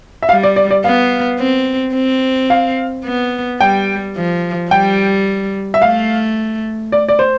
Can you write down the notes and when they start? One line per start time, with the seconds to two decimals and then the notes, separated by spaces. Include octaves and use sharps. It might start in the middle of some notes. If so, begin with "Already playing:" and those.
0.23 E5
0.29 G3 F5
0.43 D5
0.56 D5
0.71 D5
0.84 B3 F5
1.39 C4
1.94 C4
2.50 F5
3.05 B3
3.61 G3 G5
4.16 F3
4.71 G3 G5
5.74 E5
5.82 A3 F5
6.92 D5
7.09 D5
7.19 C5